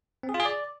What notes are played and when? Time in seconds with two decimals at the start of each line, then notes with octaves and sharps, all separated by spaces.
0.23 C4
0.29 G#4
0.34 F4
0.40 G#4
0.45 D5